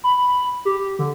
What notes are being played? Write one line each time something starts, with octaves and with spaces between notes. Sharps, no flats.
B5
G4
D3